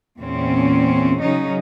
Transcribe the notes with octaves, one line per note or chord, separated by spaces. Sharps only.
E2 A#2 C4 C#4
C#3 F#3 C#4 D#4